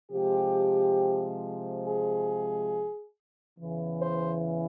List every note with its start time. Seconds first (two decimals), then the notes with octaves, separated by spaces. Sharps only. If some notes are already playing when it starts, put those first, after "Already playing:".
0.12 C3 F3 G#3 G4
1.85 G#4
3.59 E2 C#3 E3
4.02 C5